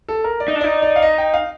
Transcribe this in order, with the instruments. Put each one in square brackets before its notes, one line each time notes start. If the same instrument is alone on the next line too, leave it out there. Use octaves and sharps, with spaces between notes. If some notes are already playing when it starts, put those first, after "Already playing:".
[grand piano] A4
A#4
D5
[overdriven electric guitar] D#4
D4
[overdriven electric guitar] D#4 [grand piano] D5
[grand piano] D5
F5
D#5
G5
F5